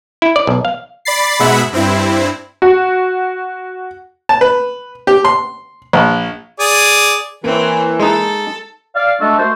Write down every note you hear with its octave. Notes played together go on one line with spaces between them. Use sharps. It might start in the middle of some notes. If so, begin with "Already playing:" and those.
E4
D5
B1
F5
D5 B5 A6 C7
G#2 B2 G#3 E5 F#5 B5
G2 C4 E4
F#4
A5
B4
G4
C6
A#1
G#4 D5
E3 A#3 C4 C#5
G#3 D#4 A4
D5 F5
G#3 A3 D4 F#4 A4
A3 F#4 A#4 C5